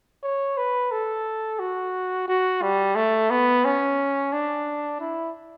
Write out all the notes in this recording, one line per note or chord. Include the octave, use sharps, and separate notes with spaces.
C#5
B4
A4
F#4
F#4
G3
A3
B3
C#4
D4
E4